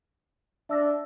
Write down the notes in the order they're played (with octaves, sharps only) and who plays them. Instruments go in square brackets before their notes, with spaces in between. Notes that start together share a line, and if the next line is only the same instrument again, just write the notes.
[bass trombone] D4 [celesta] E5 E6 A#6